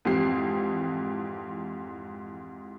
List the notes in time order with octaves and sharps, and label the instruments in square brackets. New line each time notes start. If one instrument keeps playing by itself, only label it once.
[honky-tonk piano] F2 G#2 E3 C4 G4 C7